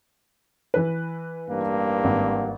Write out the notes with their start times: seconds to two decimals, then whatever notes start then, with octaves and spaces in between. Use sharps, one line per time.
0.74 E3 B4
1.48 A1 G2 A#3
2.04 G#1